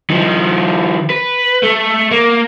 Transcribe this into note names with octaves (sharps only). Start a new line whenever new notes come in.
D#3 F3
B4
A3
A#3